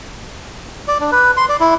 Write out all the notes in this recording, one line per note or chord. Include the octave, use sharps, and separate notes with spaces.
D5
D4
B4
C6
D5
E4